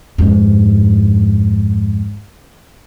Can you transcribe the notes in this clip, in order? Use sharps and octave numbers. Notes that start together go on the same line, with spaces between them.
F2 G#2